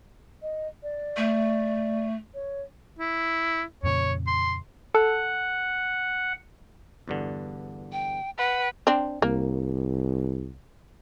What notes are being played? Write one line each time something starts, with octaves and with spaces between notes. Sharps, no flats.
D#5
D5
A3
C#5
E4
F2 A#2 C#3 C#5
C6
A4 F#5
E2 G2 D3
G5
B4 F#5
C4 D4
C2 A#3